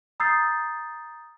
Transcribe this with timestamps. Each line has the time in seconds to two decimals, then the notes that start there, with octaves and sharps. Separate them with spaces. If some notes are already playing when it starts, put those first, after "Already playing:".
0.20 A#5 D#6 E6 G6 A6 C7